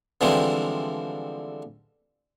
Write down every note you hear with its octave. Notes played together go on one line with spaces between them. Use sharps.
D3 E3 F3 G3 G#3 C4